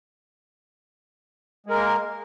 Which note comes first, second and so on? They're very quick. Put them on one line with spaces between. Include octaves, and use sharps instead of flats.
G#3 A#4 A#3